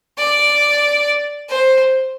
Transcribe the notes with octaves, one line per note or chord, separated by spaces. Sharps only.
D5
C5